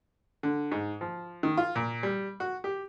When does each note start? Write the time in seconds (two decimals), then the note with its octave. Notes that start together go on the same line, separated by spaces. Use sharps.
0.43 D3
0.72 G#2
1.01 F3
1.43 D#3
1.57 F4
1.76 A#2
2.03 G3
2.40 F#4
2.64 G4